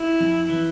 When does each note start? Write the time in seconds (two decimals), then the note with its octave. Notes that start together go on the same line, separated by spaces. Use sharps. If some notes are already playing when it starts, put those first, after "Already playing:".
Already playing: E4
0.21 F2
0.50 E3